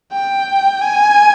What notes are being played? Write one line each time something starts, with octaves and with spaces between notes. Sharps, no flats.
G5
G#5